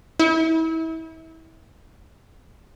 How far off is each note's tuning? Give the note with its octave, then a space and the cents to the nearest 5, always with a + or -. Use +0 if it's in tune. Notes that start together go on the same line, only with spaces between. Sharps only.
E4 -30